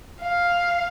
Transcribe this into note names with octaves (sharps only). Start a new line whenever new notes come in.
F5